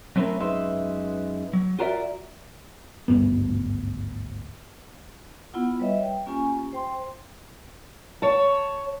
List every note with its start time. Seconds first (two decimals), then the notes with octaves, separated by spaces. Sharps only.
0.16 F#3 A3 C4 C#4 E4 A#4
0.40 F#2 G#3 D#4 B4 E5 C6
1.53 F#3
1.79 F4 F#4 A#4 B4 D5 E5
3.08 G#1 D2 G2 B3
5.54 B3 E4 F4 F#5
5.79 G3 B4 C#5 D#5 E5
6.01 G5
6.26 A#3 C#4 F4 G4 G#5 C#6
6.73 C5 G5 C6
8.22 C#5 A5